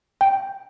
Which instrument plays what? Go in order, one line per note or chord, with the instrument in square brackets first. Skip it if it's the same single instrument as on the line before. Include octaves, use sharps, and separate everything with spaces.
[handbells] G5